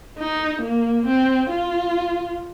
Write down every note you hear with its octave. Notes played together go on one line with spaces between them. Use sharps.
D#4
A#3
C4
F4